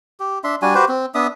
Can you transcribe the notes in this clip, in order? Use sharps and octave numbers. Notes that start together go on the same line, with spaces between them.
G4
D4 E5 C6
G3 D4 F#4 G#5
F#4 G4 B4 C5
C4
B3 D4 E5 D#6